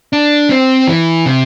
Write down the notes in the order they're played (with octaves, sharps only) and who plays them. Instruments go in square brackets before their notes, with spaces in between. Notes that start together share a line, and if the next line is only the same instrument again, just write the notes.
[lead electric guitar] D4
C4
E3
C3